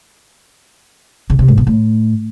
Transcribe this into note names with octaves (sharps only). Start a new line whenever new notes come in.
C#3
C3
G#2
B2
A2